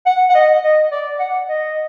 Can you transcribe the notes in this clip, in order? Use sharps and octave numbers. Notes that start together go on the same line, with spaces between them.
F#5
F#5
D#5
D#5
D5
F#5
D#5